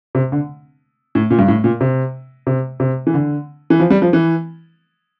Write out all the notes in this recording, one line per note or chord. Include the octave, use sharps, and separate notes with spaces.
C3
D3
A2
A#2
G2
A2
A#2
C3
C3
C3
E3
D3
E3
F3
G3
F3
E3